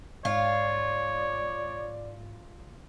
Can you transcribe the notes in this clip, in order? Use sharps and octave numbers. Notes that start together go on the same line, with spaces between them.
G#2 F4 C#5 D5